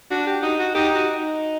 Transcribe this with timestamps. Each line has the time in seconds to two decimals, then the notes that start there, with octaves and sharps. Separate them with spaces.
0.11 D4 F#4
0.27 G4
0.42 D#4 F#4
0.59 F#4
0.75 D#4 G4
0.95 F#4
1.17 D#4